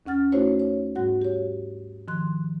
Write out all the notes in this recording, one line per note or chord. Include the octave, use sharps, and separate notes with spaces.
D#2 C#4 F#5 F6 A6
A3 D#4 E4 F#4 C5 C#5
C#5
G#2 G3 F#4 F#5
G4 C#5
D#3 F3 C6 F#6